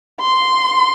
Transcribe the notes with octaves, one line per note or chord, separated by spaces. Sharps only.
C6